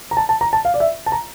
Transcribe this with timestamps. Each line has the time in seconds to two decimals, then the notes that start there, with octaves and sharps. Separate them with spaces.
0.11 A#5
0.17 A5
0.29 A5
0.41 A#5
0.53 A5
0.65 F5
0.74 D5
0.80 E5
1.06 A5
1.12 A#5